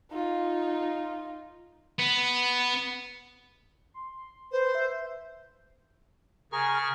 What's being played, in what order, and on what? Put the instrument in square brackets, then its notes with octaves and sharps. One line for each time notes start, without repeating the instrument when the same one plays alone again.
[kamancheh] D#4 F4
[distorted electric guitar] B3
[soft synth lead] C6
[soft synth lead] B4 [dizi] C5
[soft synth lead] E5
[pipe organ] C#3 C#6 F6 [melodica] G#4 A#4